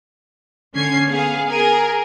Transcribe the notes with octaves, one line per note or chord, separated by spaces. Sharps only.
D3 C#4 G#6 C7
B3 G#4 F5
G#4 A#4 G#5